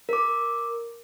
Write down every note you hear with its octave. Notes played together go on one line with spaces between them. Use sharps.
A#4 D6